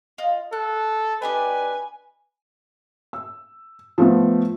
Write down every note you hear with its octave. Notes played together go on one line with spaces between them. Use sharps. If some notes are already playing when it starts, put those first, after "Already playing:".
F4 D#5
A4 F#6
D4 G4 B4 D#5 G#5
E6
F3 A3 B3